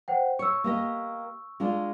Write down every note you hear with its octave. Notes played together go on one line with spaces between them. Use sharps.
C5 F#5 G5
C#5 C#6 E6
A#3 G4 D#5
G#3 D4 F4